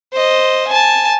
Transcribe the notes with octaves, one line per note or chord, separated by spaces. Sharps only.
C5 D#5
G#5 A5